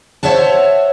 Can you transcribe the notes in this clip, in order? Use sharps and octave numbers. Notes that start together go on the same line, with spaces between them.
C5 C#5 E5 F#5 A5